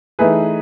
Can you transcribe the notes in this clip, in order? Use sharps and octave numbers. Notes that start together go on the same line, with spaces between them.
E3 A3 D#4 G#4 B4